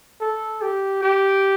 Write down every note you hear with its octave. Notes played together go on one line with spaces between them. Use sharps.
A4
G4
G4